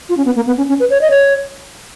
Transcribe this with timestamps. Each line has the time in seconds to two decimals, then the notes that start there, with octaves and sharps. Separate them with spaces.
0.09 F4
0.17 C#4
0.25 B3
0.36 A#3
0.47 B3
0.57 C#4
0.69 C#4
0.80 B4
0.90 C#5
1.01 D#5
1.10 C#5